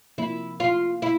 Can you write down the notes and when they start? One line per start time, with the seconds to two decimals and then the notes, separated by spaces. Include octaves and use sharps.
0.18 C3 F3 A#3 E4
0.60 F4
1.02 E4